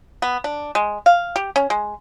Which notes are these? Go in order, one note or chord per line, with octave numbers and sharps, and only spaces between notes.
B3
D4
G#3
F5
G4
C#4
G#3